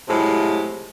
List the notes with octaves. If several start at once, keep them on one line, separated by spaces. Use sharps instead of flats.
A2 C3 F3 F#3 G#3